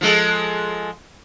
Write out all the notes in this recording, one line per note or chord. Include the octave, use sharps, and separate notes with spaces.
F3 G#3 A4